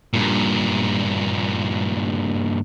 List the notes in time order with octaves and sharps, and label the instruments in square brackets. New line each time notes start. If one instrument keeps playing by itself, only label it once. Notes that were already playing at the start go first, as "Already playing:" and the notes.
[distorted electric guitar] G2 A#2